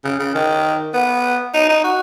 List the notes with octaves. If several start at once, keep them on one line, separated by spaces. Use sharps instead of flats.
C#3
C#3
D#3
B3
D#4
D#4
F#4